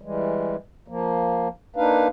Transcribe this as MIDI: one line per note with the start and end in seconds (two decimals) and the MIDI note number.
0.02 0.56 52
0.02 0.56 55
0.02 0.56 56
0.88 1.48 53
0.88 1.48 58
1.76 2.08 58
1.76 2.08 62
1.76 2.08 63
1.76 2.08 71
1.76 2.08 77